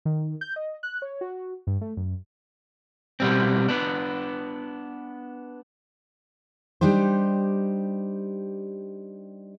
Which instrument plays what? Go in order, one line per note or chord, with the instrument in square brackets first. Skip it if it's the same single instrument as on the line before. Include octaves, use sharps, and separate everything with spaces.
[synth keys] D#3
G6
D#5
F#6
C#5
F#4
G2
A3
F#2
[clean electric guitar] B2 G3 C4
B3 D4
[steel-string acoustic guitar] G3 D4 D#4 G4 C5